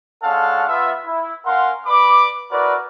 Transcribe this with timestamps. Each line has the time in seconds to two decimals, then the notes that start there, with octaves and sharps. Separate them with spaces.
0.23 G#3 C#4 D4 A4 F5 F#5
0.68 B3 F4 E5
1.06 E4
1.45 C#4 A#4 F5 F#5 C6
1.86 B4 D5 B5 D6
2.51 E4 F#4 A#4 B4 D5